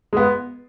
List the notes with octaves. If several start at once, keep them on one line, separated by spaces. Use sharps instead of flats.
G#3 B3